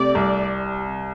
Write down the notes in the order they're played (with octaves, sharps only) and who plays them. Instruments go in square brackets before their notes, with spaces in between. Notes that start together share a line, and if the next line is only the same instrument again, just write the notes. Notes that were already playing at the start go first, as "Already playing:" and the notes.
Already playing: [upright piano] C3 A3 [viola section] D5
[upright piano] C2